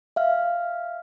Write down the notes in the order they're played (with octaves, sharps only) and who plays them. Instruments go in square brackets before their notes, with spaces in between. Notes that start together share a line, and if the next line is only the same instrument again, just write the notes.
[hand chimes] E5 F5 F6